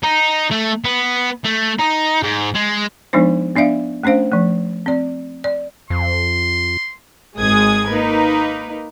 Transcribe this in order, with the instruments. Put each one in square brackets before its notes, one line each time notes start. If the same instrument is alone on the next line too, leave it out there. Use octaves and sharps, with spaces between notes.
[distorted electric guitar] D#4
A3
B3
A3
D#4
G#2
G#3
[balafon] F3 G#3 B3 D4 D#4 C5
B3 D4 D5 E5 F5
A3 C#4 D4 C5 F5
F3 A3
C4 D5
D5
[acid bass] F2 [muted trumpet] C6
[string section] G#1 G#2 G#3 G#4 D#6 G#6
A#3 D#4 A#4 B4